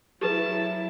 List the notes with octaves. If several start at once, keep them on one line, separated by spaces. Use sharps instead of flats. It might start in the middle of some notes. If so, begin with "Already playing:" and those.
F#3 E4 G4 G#4 B4 A5